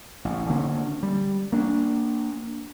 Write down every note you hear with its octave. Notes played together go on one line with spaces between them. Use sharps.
A1
D3 A#3 C#4
G3
A#3 D4